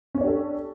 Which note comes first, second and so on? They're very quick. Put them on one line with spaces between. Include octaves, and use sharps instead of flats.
C#4 C#5 D4 G4 A4